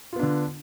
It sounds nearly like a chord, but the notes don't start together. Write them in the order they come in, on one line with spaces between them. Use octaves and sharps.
F4 B3 D4 D3